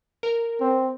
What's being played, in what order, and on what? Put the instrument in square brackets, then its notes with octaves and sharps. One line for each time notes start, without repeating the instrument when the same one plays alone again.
[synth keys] A#4
[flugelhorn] C4